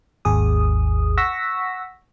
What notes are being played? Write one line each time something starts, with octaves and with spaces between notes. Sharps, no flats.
G#1 D#2 G#4 D#6
F#5 C#6 E6 A#6 B6